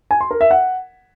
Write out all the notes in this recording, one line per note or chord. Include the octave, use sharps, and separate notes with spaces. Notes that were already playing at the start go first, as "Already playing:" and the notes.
G#5
C6
A#4
E5
F#5